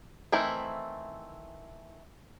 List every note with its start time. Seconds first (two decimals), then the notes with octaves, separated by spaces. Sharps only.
0.32 D#3 E3 A3 C4 E4